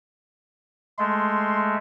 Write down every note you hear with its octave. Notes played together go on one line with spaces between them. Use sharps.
G#3 A3 C6